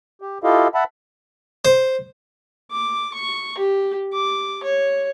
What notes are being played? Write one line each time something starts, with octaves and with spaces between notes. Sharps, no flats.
G4
E4 F4 G4 A4 D#5 F5
E5 F#5 A5 B5
C5
D6
C#6
G4
D6
C#5